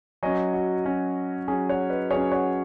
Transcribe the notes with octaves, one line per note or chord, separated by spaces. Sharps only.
F#3 C#4 D#5 G#5
F#4
F#3 C#4
F#3 C#4 G#4
C#5 F#5
B4 D#5
F#3 C#4 G#4 C#5
C#5 F#5